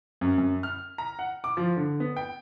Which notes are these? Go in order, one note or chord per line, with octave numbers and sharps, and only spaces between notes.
F#2
F#2
F6
A#5
F#5
D6
F3
D3
B3
G5